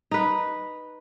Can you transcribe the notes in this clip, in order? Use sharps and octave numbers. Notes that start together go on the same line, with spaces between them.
D#4 B4